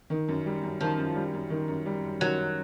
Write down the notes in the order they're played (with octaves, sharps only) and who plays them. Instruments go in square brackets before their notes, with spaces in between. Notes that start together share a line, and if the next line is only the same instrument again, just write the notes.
[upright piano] D#3
F#2
G3
F#2
[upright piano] D#3 [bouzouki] F3
[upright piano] F#2
G3
F#2
D#3
F#2
G3
F#2
[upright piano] D#3 [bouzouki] F#3
[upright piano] F#2